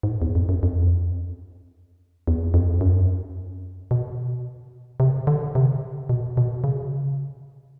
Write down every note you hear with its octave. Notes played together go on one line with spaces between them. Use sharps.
G#2
A2
E2
F2
F#2
F2
E2
F2
F#2
B2
C3
D3
C3
B2
B2
C#3